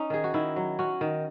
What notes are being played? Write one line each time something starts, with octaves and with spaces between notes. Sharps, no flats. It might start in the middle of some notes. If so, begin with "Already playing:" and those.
Already playing: C#4 D#4
D#3 G#4
F#4
D#3 E4
F#3
C#4 F#4
D#3